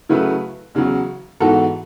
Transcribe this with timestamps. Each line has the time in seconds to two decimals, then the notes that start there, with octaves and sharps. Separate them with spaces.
0.09 C#3 F#3 A3 E4 B4
0.75 E2 C#3 F#3
1.40 G#2 E3 B3 F#4 A4